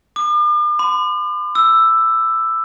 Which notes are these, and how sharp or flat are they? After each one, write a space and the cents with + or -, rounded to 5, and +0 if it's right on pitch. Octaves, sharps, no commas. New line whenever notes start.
D6 +45
B5 +45
E6 +5